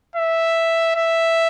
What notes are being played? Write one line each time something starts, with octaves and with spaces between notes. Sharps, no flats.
E5
E5